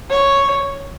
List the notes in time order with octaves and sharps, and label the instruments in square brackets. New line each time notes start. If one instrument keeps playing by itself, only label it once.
[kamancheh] C#5